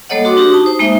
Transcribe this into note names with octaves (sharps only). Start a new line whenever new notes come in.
G3 A#3 A4 C#5 D#5 F#5
F#4 C6 D6 D#6
D4 F#4 G4
D#4 A5 D#6
C5
G#3 A#3 D#4 E5